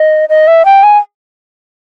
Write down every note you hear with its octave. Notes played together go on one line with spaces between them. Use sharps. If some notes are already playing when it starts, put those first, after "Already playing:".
Already playing: D#5
D#5
E5
G5
G#5